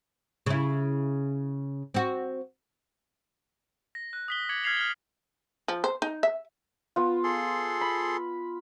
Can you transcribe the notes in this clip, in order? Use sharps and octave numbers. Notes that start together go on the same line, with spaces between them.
C#3 E4
C4 F#4
A#6
F#6
D#6 B6 G7
D6 G#6 C#7 F#7
F6 G#6 B6 C7 F7 F#7
F6 G7
F3
C5
D#4
E5
B3 F4
G#4 A4 C6
B5